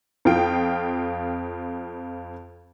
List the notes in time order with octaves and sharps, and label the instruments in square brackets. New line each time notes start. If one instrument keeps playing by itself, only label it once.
[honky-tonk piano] F2 F4 G5